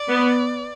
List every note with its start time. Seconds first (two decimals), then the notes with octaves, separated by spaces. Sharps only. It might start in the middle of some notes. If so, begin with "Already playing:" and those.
Already playing: D5
0.09 B3